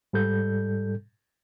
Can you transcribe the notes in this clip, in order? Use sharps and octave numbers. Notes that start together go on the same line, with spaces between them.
G#2 G3 A4 G6